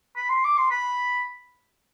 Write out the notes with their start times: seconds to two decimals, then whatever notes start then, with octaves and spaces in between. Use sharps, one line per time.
0.17 B5
0.30 C6
0.44 D6
0.58 C6
0.71 B5